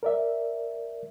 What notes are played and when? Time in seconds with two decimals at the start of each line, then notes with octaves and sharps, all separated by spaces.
0.03 A#4 D5 E5